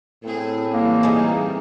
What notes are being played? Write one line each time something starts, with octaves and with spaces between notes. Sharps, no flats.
A2 C4 G#4
E3 G3 A#3 C4
D#4 G#4